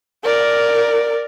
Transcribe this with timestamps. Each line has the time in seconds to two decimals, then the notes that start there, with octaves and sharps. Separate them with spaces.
0.24 A#4 D5